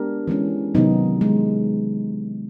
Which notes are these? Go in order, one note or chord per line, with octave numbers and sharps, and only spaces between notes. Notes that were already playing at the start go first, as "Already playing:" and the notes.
Already playing: G#3 B3 D4 G4 A#4
E3 G#3 C#4
C3 D#3 F#3 B3 D#4
G#3